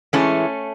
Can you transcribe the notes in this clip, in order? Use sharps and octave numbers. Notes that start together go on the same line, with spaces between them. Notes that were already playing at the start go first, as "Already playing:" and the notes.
A2 E3 G#3 A3 C#4